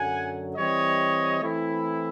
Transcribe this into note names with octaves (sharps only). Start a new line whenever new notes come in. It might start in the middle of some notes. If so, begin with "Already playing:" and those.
Already playing: F#2 D3 F#3 F#5 G#5
E3 G3 C4 C#5 D#5
E3 A3 C4 E4